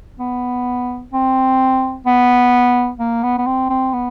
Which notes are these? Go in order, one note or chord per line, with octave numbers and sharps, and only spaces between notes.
B3
C4
B3
A#3
B3
B3
C4
C4
B3